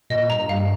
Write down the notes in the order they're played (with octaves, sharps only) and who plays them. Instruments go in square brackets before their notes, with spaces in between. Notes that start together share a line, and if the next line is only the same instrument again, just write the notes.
[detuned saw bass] A#2 [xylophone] D#5
[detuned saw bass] G2 [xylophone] A#5
[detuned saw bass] G2 [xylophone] F5